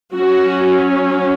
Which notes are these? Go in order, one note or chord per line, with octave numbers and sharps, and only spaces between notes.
F#3 C#4 F#4